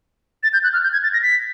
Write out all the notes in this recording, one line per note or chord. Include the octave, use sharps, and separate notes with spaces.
A6
G6
F#6
F6
G6
G#6
A6
A#6
B6